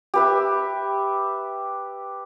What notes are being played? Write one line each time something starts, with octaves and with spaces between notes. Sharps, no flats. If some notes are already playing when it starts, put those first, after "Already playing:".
G4 B4 E5